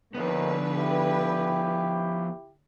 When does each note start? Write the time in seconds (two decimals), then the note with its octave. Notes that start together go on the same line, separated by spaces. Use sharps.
0.15 D#2 D3 F3 B3 B4
0.77 E4 G4